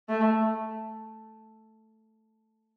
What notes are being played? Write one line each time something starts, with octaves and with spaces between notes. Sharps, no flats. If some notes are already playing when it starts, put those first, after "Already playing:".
A3